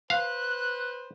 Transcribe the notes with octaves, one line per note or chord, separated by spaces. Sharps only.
B4 C5 F5 F#6